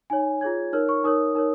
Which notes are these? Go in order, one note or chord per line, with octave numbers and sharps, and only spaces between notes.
D#4 C#5 G#5
F4 G#4 C#5 G#6
D#4 A#4 C#5 F6
C#6
D#4 A#4 C#5 D#6
D#4 A#4 C#5